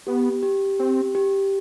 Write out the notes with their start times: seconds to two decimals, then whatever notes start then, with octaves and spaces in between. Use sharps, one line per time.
0.07 B3 G4
0.43 G4
0.79 C4 G4
1.15 G4